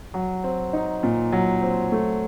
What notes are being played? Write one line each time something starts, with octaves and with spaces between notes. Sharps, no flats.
F#3
C4
D#4
A#2
F#3
C4
A3